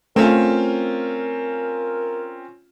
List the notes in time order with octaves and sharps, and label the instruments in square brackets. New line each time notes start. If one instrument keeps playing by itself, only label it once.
[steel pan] A3 [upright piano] C4 C#4 F4 [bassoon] A#4